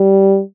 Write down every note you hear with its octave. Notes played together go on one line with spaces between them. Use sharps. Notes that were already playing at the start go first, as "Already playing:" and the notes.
Already playing: G3